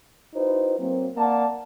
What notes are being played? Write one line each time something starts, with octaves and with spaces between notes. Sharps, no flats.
D#4 E4 F#4 B4 C5
F#3 A#3 C4
A#3 D5 F#5 A5